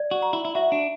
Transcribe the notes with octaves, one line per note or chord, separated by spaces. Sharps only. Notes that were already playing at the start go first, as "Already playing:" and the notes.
Already playing: D5
F#4
A#5
E4
E4
F#4 E5
D4